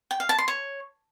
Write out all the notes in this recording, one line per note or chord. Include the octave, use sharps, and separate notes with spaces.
G5
F5
A5
C6
C#5